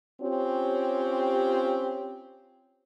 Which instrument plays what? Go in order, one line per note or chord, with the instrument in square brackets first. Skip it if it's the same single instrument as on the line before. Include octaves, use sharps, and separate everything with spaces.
[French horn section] C4 C#4 F4 G4 C#5